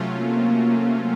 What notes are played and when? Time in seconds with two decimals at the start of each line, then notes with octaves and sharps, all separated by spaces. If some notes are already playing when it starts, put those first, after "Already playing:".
Already playing: C3 F#3 A3 C#4 F4
0.16 A#3